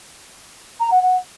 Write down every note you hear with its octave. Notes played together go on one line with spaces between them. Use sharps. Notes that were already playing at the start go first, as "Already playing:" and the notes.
A#5
F#5
F#5